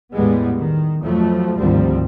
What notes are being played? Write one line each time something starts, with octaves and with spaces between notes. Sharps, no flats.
E2 A2 G3 G#3 B3
D#3
F2 F3 F#3 A3
G#1 D2 D#3 F3 G3 C4